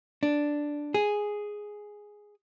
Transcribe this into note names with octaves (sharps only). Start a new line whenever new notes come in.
D4
G#4